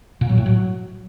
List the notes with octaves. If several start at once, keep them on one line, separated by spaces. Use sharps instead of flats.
A#2
F#3
A2
F#3